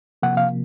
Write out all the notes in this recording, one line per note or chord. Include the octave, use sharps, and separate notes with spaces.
C3 F3 A#3 F#5
F5